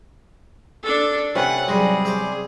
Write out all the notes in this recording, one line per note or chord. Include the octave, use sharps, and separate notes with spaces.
D4 A4
C3 C#4 B4 F#5
G#2 F#3 G3 G#4
G4 C5 E5